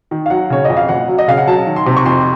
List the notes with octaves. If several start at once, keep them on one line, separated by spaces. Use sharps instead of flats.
D#3
F5
F#3 F#5
C#3 C#5
F2 D#5
F5
F#1 F#5
F#3
D#5
C#3 F5
F#5
F#3 A5
D#3
C6
C3
C#6
F2 C6